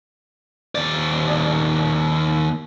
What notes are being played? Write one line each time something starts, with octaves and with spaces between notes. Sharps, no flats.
D#2 D5